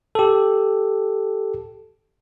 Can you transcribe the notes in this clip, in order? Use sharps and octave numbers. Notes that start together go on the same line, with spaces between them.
G4 A4